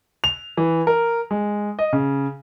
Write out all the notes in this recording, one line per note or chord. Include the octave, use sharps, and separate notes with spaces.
F7
E3
A#4
G#3
D#5
C#3